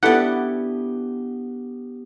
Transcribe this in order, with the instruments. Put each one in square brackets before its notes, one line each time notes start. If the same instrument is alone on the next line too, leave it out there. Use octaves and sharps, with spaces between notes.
[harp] B3 G4 [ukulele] D4 A4 B4 [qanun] E4 D5 [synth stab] F#5